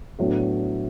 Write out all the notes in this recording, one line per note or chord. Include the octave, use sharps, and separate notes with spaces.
A2 F#3 B3 D4